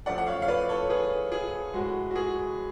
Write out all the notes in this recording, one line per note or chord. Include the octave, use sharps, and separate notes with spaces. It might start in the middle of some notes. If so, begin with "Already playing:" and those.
F#2 F3 A3 D5 F#5
F#5
C#5 F5
F5
B4 D5
A4 C#5
G#4 B4
G#4
A2 G#3 F#4
F#4
G#4